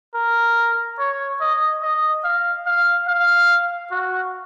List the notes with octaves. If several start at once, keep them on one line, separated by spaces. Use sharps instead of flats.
A#4
C#5
D#5
D#5
F5
F5
F5
F#4